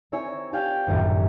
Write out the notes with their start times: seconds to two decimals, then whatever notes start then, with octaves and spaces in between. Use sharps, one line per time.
0.12 C4 E4 A#4 C#5 E5 G#5
0.53 F4 G4 D5 F5 G5 G#5
0.87 D#1 A#1 F#2 A2